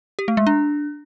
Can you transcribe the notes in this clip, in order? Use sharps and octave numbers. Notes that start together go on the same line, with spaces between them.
G4
A3
G#3
D4